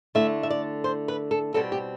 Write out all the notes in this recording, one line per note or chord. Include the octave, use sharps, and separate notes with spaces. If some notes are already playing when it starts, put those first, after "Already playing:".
D3 A3 E4 E5
E5
D5
C5
B4
A4
B2 G3 C4 A4
G4